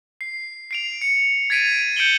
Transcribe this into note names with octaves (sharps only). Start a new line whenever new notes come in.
C7
C7 D7 F7
C#7
G#6 A6 B6 D7 D#7 F7
G6 C#7 D7 E7 F#7 G7